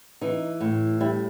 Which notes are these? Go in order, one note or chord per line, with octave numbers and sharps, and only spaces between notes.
E3 D#4
A2
G3 E4